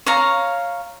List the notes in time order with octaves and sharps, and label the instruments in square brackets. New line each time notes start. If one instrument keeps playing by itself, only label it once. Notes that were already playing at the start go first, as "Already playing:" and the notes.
[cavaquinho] C#5 F5 A#5